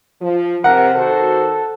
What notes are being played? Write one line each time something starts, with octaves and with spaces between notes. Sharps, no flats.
F3
C3 A#4 F#5
D#3 F#4 A4 C5